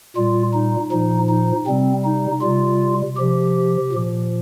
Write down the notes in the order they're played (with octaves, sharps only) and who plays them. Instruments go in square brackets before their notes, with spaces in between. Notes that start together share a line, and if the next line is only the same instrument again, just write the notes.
[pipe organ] A#2 G3 F4
D#4
A#2 F3 D#4
D#4
C3 G3 C4
D#4
C3 G3 F4
C3 F3 G4
A#2 F3